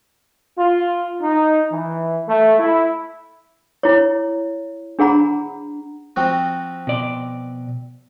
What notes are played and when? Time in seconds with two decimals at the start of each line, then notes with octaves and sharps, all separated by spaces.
0.57 F4
1.21 D#4
1.72 E3
2.28 A3
2.59 E4
3.83 E4 C#5
4.99 D4 G#4 F#5 A#5 B5
6.16 F3 C4 F#4
6.87 B2 D5